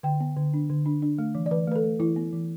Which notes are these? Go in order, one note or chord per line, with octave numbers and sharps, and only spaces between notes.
D3 G5
B3
D3
D4
D3
D4
D4
A3
E3
D5
E3 B4
A3 B4
A4
A3
E3 E4
B3
E3